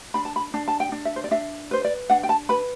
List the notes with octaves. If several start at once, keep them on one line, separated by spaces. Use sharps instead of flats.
D4 B5
A5
B5
D4 A5
A5
G5
D4
E5
C5
D5
D4 E5
B4 C5
D5
D4 F#5
G5
A5
B4 B5